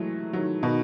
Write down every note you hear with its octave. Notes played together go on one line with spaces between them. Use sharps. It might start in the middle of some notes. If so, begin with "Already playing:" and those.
Already playing: E3 F#3 G#3 A3
D#3 F#3
B2 D#3